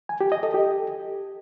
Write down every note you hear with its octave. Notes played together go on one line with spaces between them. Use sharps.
G#5
G4
D#5
A4
G4